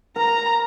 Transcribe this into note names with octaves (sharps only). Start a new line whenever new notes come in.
A#4 A#5